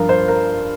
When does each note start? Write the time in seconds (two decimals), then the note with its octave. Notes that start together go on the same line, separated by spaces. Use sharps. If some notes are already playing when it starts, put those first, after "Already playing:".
Already playing: G2 F3 F4 A#4
0.09 C5
0.28 A#4